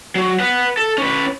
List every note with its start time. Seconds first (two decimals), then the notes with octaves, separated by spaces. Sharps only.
0.15 F#3
0.40 B4 F#5
0.77 A4
0.98 C#4 B4